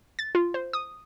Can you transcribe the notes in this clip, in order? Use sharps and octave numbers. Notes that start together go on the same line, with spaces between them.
A6
F4
C5
D#6